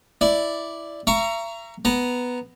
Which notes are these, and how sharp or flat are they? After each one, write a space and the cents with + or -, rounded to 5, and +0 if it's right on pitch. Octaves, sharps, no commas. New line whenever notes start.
E4 +0 D5 +0
E5 +45 A#5 +0 C#6 +15
B3 +0 A#5 +0